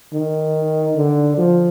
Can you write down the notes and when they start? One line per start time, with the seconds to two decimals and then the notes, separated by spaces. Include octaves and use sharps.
0.13 D#3
0.95 D3
1.37 F3